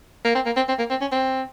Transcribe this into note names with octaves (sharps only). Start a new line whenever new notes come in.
A#3
C4
A#3
C4
C4
A#3
C4
C#4
C4